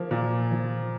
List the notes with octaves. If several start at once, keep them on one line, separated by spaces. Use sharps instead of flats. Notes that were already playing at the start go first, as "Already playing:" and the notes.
Already playing: F3 A#3
A#2
F3